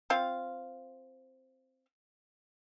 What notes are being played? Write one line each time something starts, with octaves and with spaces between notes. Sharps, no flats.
C4 F4 F5